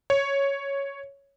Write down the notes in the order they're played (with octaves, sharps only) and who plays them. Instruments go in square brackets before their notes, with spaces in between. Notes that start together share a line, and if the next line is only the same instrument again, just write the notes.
[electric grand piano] C#5